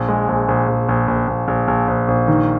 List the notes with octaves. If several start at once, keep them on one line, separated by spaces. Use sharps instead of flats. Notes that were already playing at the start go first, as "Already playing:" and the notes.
Already playing: A#1
G#3
A#1
A#1
A#1
A#1
A#1
A#1
A#1
A#1
A#1
A#1
D#3